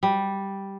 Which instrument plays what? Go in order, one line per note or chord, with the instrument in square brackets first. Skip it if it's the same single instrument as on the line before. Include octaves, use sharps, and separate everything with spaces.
[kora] G3